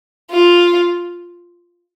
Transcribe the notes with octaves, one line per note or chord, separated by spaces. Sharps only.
F4